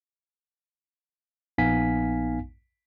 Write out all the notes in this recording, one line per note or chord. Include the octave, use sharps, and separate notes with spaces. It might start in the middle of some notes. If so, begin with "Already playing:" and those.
A#1 B3 D#4 F5 G#5 B6